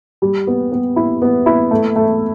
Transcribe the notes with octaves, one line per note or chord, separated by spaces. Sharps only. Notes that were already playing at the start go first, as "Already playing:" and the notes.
G3
B3
B3
E4
B3
E4
A3
A3